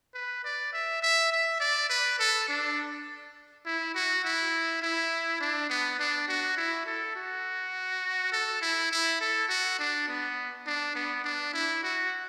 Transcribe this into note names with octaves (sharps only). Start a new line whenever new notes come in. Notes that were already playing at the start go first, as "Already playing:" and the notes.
B4
D5
E5
E5
E5
D5
B4
A4
D4
E4
F#4
E4
E4
D4
B3
D4
F#4
E4
A4
F#4
A4
E4
E4
A4
F#4
D4
B3
D4
B3
D4
E4
F#4